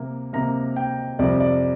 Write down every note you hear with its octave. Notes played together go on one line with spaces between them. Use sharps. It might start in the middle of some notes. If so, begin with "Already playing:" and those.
Already playing: C3 A#3
C3 A#3 A#5
G5
F2 C3 G3 D5
D5